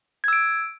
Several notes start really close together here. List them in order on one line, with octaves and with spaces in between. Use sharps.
G#6 E6 D7